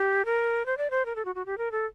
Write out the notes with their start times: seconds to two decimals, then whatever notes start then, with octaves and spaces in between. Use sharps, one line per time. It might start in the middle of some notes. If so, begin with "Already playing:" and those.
Already playing: G4
0.25 A#4
0.66 C5
0.77 D5
0.90 C5
1.06 A#4
1.16 A4
1.25 F#4
1.35 F#4
1.46 G4
1.58 A#4
1.72 A4